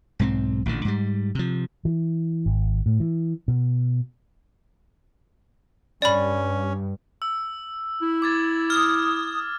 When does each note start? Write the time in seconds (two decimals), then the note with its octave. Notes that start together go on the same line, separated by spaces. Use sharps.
0.19 B1 G#2 G3 C4
0.66 A1 A#2 D3
0.85 G#2 G3
1.35 C3 F3
1.85 E3
2.46 G#1
2.86 A2
3.00 E3
3.48 B2
6.02 G2 C#4 D5 B5
7.22 E6
8.02 E4
8.22 D6 G#6 A6
8.70 D#6 F6